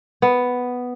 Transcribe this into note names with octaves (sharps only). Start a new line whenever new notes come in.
B3